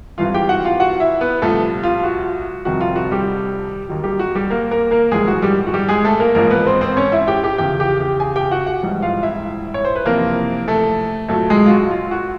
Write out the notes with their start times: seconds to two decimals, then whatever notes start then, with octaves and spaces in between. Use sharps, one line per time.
0.18 G#1 G2 E3 G3 F4 F5
0.34 G4 G5
0.49 F#4 F#5
0.64 F4 F5
0.80 F#4 F#5
1.00 E4 E5
1.21 B3 B4
1.42 C2 A#2 F3 A3 A4
1.83 F4
2.03 F#4
2.65 F1 F2 C3 D#3 G3 F#4
2.81 F4
2.96 F#4
3.11 G3 G4
3.88 D#2 D#3 F#3
4.04 G3 G4
4.19 F#4
4.35 G3 G4
4.50 A#3 A#4
4.71 A#3 A#4
4.91 A#3 A#4
5.12 A#1 G#2 E3 G3 G#3 G#4
5.28 F#4
5.42 G3 G4
5.67 F#4
5.74 G3 G4
5.89 G#3 G#4
6.05 A3 A4
6.20 A#3 A#4
6.35 A1 G#2 F3 A#3 A#4
6.51 B3 B4
6.66 C4 C5
6.81 C4 C5
6.97 C#4 C#5
7.12 E4 E5
7.28 G4 G5
7.43 G4 G5
7.58 E2 C#3 F3 G4 G5
7.80 G4 G5
8.00 G4 G5
8.20 G#4 G#5
8.36 G4 G5
8.52 F#4 F#5
8.66 F#4 F#5
8.82 A#1 G#2 E3 G3
9.02 F4 F5
9.23 E4 E5
9.74 C#5
9.85 C5
9.96 B4
10.05 F#1 F2 C3 E3 A#3 A#4
10.68 A3 A4
11.28 B1 A#2 F#3 A3 A4
11.50 G#3 G#4
11.66 F4
11.70 F#4
11.91 F4
12.11 F#4